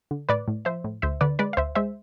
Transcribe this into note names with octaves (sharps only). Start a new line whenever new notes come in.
D3
A2 B4 D5
A2
F3 C5 E5
A2
D2 C5 E5
D3 B4 D5
G#3 B4 D5
F5
D2 C5 E5
G#3 C5 E5